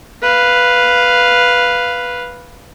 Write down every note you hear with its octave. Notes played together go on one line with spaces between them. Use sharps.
B4 F5